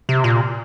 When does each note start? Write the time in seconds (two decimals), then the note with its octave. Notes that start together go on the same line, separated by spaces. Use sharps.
0.09 C3
0.24 A#2